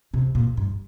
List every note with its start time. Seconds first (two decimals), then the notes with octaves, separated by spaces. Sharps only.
0.14 C3
0.35 A#2
0.57 G2